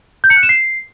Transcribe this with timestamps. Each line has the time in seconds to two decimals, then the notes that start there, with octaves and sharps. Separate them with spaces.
0.24 G6
0.30 C#7
0.36 F#6
0.43 E7
0.49 C7